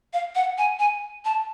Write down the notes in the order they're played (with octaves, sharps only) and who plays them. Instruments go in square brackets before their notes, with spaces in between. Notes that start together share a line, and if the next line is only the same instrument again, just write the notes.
[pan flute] F5
F#5
G#5
G#5
A5